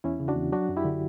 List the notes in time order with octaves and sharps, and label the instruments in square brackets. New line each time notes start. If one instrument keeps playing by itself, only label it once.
[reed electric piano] E2 C#4 E4
C#3
D4 F#4
E2
F#3 D4 F#4
F#2
E4 G4
D3